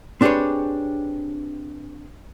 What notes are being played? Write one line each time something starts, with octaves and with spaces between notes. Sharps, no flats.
C4 D4 G4 G#4 B4 C#5